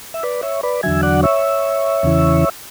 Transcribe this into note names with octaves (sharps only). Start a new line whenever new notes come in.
E5
B4 D5
C#5 E5
B4 D5
E2 D3 F#3 E5 G#5
D5 F#5
C#5 E5
E2 C#3 E3